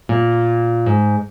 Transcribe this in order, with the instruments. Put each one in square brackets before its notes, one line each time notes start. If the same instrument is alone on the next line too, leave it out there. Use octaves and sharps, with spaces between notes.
[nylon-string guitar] A#2
G#2